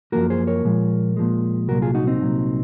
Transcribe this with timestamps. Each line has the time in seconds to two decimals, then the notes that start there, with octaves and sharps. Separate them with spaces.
0.12 F#2 F3 A#3 F#4 A#4
0.30 G#4 C5
0.47 A#4 C#5
0.65 A#2 F3 G#3
1.17 A#2 F3 G#3
1.68 C2 A#2 F#3 F#4 A#4
1.82 F4 G#4
1.95 D#4 F#4
2.07 C4 D#4
2.21 C2 A#2 F#3